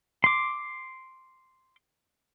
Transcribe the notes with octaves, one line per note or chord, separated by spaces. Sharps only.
C6 D6